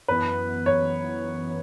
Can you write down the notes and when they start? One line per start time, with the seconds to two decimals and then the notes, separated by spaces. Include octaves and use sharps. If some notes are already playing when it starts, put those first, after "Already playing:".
0.08 F#2 E3 B3 B4
0.66 C#5